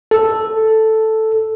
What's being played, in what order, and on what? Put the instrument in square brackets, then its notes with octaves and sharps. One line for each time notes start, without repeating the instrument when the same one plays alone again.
[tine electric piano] A4